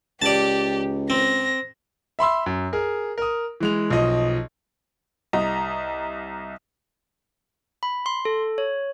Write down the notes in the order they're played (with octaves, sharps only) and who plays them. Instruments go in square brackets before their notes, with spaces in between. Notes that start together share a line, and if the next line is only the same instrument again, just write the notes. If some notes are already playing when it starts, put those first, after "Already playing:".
[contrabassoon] C#2 [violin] G4 [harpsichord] D5 A5
[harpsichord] C4 [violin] A#6
[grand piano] E5 B5 C6 E6
F#2
G#4 A#4
A#4 D#6
E3 G#3 F7
B1 F3 D#5
[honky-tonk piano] C2 D#5 A#5
[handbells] B5
C6
A4
C#5